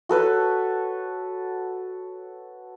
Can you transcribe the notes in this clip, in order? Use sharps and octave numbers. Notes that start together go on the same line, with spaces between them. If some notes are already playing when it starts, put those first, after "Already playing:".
F#4 A4 B4 C#5